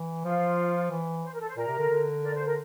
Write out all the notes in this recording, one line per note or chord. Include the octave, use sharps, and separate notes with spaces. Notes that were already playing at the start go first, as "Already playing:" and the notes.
Already playing: E3
F3 F4
E3
C5
A#4
A4
C5
A#2 A#4
C3
D3
D3
A#4 D5
C5
A#4